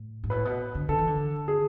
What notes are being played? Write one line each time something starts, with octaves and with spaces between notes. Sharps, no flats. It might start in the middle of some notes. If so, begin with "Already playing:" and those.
Already playing: A2
G#2
A2 B4
B2
D3
D3 A4
E3
D3
G#4